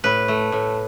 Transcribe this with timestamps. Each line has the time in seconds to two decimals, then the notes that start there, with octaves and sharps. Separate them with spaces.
0.04 A2 B4
0.28 A3
0.52 A2